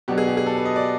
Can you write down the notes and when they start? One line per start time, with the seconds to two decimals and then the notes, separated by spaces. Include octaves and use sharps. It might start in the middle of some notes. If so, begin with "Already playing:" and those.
0.08 B2 F#3 B3 D4 G4
0.18 G#4
0.27 G4
0.37 G#4
0.46 A4
0.57 B4
0.65 D#5
0.76 D5